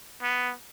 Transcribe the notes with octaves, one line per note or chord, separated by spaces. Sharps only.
B3